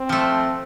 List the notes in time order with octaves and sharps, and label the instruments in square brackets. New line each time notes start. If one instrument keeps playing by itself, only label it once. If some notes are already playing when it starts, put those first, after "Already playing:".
Already playing: [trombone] C4
[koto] F3 A3